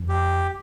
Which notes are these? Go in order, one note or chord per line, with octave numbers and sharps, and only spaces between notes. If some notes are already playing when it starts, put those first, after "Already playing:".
Already playing: F2
G4